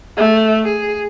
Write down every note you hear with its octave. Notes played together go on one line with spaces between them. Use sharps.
A3
G#4